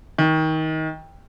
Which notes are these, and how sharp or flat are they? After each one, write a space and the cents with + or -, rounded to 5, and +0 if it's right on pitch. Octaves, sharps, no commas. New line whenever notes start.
D#3 +25